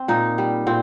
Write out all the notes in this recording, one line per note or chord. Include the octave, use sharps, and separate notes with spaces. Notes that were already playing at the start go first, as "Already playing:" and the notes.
Already playing: C4
A#2 D#4
G3
A#2 C4